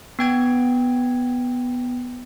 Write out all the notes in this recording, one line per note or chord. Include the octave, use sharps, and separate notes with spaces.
B3 G5 G#6